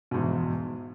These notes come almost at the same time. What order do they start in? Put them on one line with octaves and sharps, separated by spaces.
B2 G#2 E2